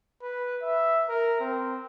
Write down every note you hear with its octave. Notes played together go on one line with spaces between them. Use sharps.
B4
E5
A#4
C4